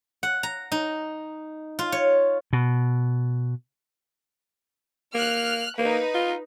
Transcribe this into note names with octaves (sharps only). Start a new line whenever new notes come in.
F#5
A#5
D#4
F4
C#5
B2
A#3 F6 F#6
A#3 D#4 B4
F4